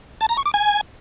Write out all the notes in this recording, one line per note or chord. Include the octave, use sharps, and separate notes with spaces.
A5
A#5
C#6
D6
G#5